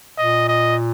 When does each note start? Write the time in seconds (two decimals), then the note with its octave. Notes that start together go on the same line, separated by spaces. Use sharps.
0.18 A#2 D#5
0.49 D#5